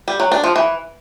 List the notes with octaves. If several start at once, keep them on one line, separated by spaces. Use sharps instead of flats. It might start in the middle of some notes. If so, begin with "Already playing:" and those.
G3
F#3
D4
F3
E3